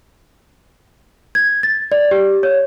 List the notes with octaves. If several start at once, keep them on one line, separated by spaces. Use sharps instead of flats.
G#6
A6
D5
G4
C#5